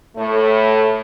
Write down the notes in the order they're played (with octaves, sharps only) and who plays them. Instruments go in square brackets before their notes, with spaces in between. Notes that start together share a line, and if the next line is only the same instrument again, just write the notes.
[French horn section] A2 A3